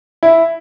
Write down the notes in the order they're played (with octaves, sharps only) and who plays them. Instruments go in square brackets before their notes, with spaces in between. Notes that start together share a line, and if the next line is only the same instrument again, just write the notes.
[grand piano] E4